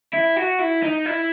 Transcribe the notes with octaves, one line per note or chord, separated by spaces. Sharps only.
E4
F#4
E4
D#4
E4